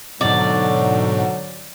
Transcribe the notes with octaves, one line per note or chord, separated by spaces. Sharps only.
G#2 B2 D3 F#3 D5